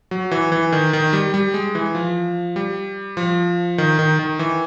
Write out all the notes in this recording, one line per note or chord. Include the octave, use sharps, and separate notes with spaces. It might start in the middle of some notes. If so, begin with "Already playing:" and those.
F#3
E3
E3
D#3
D#3
G3
G3
G#3
E3
F3
G3
F3
D#3
D#3
D#3
E3